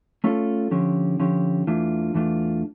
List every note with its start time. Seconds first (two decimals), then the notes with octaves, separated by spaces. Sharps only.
0.24 A3 C#4 F4 A4
0.71 D3 F3 C#4 G4
1.19 D3 F3 C#4 G4
1.67 E2 E3 A3 D4 F4
2.14 E2 E3 A3 D4 F4